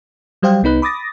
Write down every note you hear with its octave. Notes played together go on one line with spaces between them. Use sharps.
F#3 G3 C5 F5 G5
C2 B3 D#4 B4 F#6
B5 D6 D#6 A6 A#6